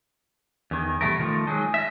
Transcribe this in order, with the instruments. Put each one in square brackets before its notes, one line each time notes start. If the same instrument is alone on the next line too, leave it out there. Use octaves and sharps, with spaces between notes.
[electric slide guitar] E2 D#3
B2 G3 A3 A#4
D#3 F3 A3
F#3 G#3 D#4
D#5 E5